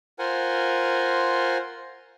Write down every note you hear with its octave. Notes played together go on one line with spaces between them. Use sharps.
F4 A#4 C5 F#5 G#5